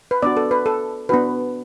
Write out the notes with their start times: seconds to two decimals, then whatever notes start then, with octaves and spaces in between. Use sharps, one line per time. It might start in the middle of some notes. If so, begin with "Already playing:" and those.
0.11 B4
0.22 B3 D4 F#4 D5
0.37 A4
0.51 B4
0.66 A4
1.09 B3 D4 F#4 B4